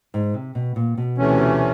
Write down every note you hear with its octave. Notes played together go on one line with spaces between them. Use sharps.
G#2
C3
B2
A#2
B2
D2 C3 E3 A3 C#4